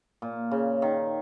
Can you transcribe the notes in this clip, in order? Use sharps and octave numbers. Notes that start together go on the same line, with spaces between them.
A#2
C#3
D#3